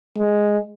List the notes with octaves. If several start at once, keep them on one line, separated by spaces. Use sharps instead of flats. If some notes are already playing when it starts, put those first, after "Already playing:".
G#3